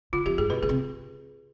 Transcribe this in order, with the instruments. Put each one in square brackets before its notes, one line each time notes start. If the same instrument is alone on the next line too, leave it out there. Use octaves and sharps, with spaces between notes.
[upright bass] D3 [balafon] F4
[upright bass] F2 [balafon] G4
[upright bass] G2 [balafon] G#4
[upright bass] B2 [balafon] B4
[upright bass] B2 [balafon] G#4
[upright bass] C3